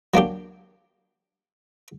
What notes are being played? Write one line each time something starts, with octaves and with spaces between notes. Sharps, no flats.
F#3 A#3 D4 G4